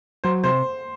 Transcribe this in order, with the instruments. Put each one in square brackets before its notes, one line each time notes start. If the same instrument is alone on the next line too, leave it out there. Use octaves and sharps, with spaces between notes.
[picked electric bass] F#3 [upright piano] C5
[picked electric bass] C3 [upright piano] C5